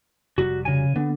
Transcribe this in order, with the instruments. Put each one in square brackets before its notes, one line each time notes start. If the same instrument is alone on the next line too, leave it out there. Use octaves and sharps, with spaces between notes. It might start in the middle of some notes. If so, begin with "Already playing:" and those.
[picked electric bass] F1 F#3 G3 [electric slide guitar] F#4
[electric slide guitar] C#3 G#5
[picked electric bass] D3 [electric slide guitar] B3